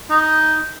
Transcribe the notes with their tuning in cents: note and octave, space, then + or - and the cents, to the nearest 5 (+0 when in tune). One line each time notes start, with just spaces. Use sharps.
D#4 +5